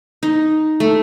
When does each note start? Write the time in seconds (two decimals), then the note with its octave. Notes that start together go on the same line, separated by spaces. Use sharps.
0.23 D#4
0.80 A3